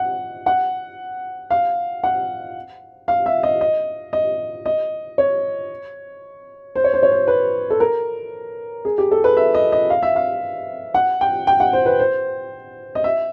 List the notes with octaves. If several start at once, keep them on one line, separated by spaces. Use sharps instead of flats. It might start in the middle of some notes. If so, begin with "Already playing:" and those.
Already playing: F#5
F#5
F5
F#5
F5
E5
D#5
D#5
D#5
D#5
C#5
C5
C#5
C5
C#5
C5
B4
A4
A#4
G#4
G4
A4
B4
E5
D#5
D#5
F5
E5
F5
F#5
G5
G5
F#5
C5
B4
C5
D#5
E5